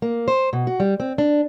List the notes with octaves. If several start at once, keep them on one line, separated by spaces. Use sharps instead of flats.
A#3
C5
B2
F#4
G3
C4
D4